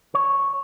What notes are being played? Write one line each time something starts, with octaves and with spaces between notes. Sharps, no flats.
C#5